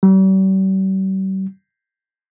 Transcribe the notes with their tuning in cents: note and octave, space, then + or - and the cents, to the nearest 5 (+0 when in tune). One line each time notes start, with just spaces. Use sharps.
G3 -45